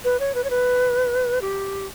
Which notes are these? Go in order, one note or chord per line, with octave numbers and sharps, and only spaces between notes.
B4
C#5
B4
C#5
B4
G4